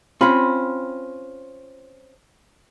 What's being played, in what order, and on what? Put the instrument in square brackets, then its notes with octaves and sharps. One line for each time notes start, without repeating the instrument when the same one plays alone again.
[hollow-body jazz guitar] C4 C#4 [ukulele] F4 B5